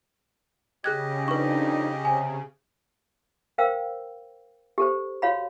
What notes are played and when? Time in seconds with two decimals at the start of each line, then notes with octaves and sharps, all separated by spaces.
0.84 C#3 G4 G#4 D#5 F#6 G#6
1.28 F2 D4 D#4 B4 C#6
2.05 C3 G#5
3.58 A#4 C5 F5 G5 E6
4.78 G4 A4 C5
5.22 F#4 C#5 F5 B5